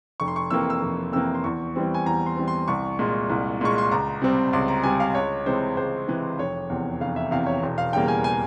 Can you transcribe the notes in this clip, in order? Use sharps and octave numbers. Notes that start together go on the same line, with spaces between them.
F1 C#6
C6
C#6
F2 C3 E3 A#3 E6
E6
F1
F2 C3 E3 A#3 E6
C6
E2 C#6
E3 G3 C4
G#5
E2 A#5
C6
E3 G3 C4
C6
C2 C#6
A#2 G#3
C2
A#2 G#3 C#6
C6
C#2 A#5
C3 G3 C4
C#2 C6
A#5
C3 G3 C4 G#5
F5
C#2 C#5
C3 E3 G#3 C5
C#2 C5
C3 E3 G#3
F1 C#5
E2 C3
F1 F5
E5
E2 C3 F5
C#5
E1
F5
E2 C#3 G3 A#3 G5
G#5
G#5